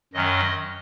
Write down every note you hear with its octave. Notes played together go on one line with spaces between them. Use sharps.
F#2 D#3 F#3 C#4 D#5